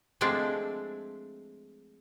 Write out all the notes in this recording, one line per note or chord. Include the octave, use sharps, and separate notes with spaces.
F3 G#3 A3 C4 D4